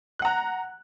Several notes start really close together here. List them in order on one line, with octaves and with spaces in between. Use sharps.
F#6 F#5 A#5